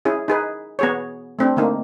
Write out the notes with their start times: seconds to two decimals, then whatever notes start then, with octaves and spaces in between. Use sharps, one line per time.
0.05 C#4 E4 G#4
0.28 D#4 G#4 B4
0.79 B3 G#4 C#5
1.39 A3 C4 D4
1.57 D3 A3 A#3 D#4